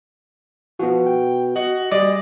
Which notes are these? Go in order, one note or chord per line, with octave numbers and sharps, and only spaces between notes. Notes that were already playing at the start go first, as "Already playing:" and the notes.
F3 B3 F#4
G5
F#4 D#5
G3 D5 D#5